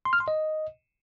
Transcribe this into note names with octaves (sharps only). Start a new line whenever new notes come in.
C6
F6
C6
D#5